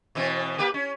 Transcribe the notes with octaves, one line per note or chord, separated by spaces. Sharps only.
B2 E3 C4
A#3 G4 B4
C#4